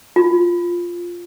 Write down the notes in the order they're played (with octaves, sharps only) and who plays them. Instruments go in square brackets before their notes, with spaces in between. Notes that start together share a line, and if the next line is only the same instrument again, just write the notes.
[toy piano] F4